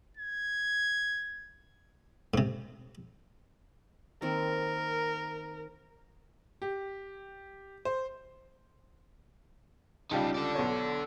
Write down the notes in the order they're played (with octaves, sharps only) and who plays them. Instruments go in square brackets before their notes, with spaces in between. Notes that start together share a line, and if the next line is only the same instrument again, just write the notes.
[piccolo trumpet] G#6
[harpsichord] G#2 C3
[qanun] D#3 A#3 C4 [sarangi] A#4
[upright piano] G4
C5
[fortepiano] C#2 G3 F4 [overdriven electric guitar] D#4 A4
[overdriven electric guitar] A4 D5
[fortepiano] B1 C#5